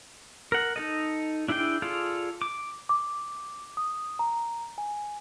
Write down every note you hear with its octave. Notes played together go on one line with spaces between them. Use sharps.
A#4 F#5
D#4 A4 D#5
D4 E4 G#4 D5 G5
F4 G#4 A4 D5 F5
D6
D6
D#6
A#5
G#5